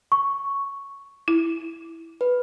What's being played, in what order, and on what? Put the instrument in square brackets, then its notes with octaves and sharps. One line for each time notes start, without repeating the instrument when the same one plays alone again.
[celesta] C#6
[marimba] E4
[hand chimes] B4